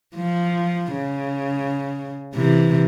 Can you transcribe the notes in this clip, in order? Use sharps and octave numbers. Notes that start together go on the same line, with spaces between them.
F3
C#3
C3 E3